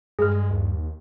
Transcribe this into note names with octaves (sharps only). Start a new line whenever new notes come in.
G2 G#3 G#4 F6
D#2